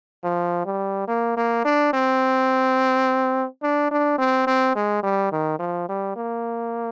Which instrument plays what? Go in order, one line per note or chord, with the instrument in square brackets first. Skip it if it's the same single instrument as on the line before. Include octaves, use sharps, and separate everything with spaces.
[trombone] F3
G3
A#3
A#3
D4
C4
D4
D4
C4
C4
G#3
G3
D#3
F3
G3
A#3